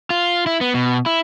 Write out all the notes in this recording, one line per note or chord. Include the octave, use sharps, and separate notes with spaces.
F4
E4
B3
B2
E4